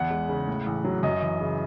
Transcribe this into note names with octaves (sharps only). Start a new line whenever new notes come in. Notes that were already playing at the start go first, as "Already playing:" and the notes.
Already playing: E2 F#5
G#3
C#3
A2
A1
F#3
F#2 D#5
E3
C#3